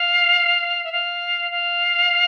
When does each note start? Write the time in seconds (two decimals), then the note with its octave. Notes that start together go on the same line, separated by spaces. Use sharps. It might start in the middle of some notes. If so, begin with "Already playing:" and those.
Already playing: F5
0.84 E5
0.92 F5
1.51 F5